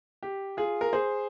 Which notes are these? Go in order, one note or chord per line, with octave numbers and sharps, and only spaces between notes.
G4
F4 G#4
A#4
G#4 C5